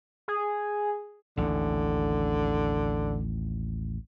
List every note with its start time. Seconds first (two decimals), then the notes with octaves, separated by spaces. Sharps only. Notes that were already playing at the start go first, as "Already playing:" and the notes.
0.28 G#4
1.37 A1 D#2 D3